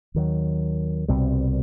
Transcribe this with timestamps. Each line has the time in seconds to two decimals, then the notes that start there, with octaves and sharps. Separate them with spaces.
0.14 D#2 D#3 F#3
1.08 C2 B2 G3 C4